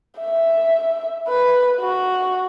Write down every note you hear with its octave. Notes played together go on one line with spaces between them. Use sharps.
E5
B4
F#4